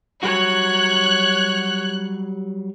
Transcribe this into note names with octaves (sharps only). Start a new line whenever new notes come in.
F#3 G3 F#4 C#5 F#6